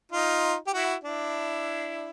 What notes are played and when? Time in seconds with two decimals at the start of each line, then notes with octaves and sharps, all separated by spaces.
0.12 D#4 F4
0.67 G4
0.73 E4 F#4
1.04 D4 E4